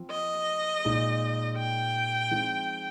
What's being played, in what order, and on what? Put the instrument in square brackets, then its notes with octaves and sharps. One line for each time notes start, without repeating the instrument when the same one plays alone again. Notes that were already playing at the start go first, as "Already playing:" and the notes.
Already playing: [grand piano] F3 C4 F4
[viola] D#5
[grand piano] A#2 G#3 D#4
[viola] G5
[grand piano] F3 G#3 C4 D#4